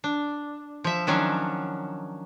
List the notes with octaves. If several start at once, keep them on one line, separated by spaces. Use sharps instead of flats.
D4
F3 E5
D#3 F3 F#3 C#4 D4